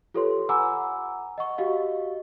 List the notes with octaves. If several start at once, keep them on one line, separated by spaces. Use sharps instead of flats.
F4 G4 A4 B4 C#5 C6
F#5 G#5 A#5 B5 D6 E6
D#5 F#5 C#6
F#4 G4 D#5 F5